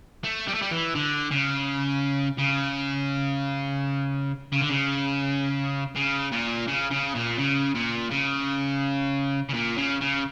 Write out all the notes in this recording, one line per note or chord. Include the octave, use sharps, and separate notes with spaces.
A3
G3
A3
G3
E3
D3
C#3
C#3
C#3
D3
C#3
C#3
A#2
C#3
C#3
A#2
C#3
A#2
C#3
C#3
A#2
C#3
C#3